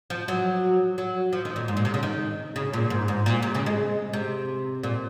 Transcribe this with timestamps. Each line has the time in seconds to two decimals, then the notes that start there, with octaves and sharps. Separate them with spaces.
0.10 F3
0.28 F#3
0.98 F#3
1.33 F3
1.45 D#3
1.56 A#2
1.68 G#2
1.77 A#2
1.85 C3
1.94 C#3
2.03 D#3
2.56 C#3
2.73 A#2
2.90 G#2
3.08 G#2
3.26 A#2
3.42 C3
3.55 C#3
3.66 G#3
4.13 C3
4.83 A#2